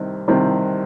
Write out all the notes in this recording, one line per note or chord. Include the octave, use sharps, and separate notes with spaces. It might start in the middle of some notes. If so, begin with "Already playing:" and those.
Already playing: C2 C3 D#3 C4 D#4
C2 C3 D#3 C4 D#4